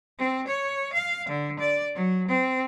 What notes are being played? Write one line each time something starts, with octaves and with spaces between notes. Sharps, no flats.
C4
C#5
F5
D3
D5
F#3
C4